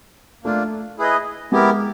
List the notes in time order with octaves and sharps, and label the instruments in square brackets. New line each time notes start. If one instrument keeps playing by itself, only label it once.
[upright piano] A3 [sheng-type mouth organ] A#3 D4 F4
[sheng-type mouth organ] E4 G#4 B4 D#5
[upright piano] G#3 [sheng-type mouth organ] B3 E4 G4 A#4